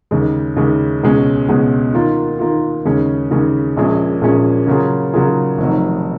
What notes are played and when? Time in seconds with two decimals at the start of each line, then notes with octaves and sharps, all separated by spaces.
0.11 D#2 C#3 G#3
0.56 D#2 C#3 G#3
1.03 C#2 B2 G#3 C#4
1.48 C#2 B2 G#3 C#4
1.93 D#3 A#3 F4
2.39 D#3 A#3 F4
2.85 D#2 C#3 G#3 C#4
3.31 D#2 C#3 G#3 C#4
3.77 A#1 A#2 G#3 C#4 G#4
4.21 A#1 A#2 G#3 C#4 G#4
4.67 C#3 F#3 A#3 F4 G#4
5.13 C#3 F#3 A#3 F4 G#4
5.58 F1 F2 D#3 F#3